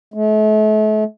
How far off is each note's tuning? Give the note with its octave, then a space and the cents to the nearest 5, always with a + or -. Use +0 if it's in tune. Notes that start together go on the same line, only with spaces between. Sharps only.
A3 -40